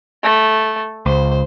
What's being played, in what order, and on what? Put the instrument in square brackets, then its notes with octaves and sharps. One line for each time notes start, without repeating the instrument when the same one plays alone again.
[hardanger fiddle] A3
[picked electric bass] C#2 [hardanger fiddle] C5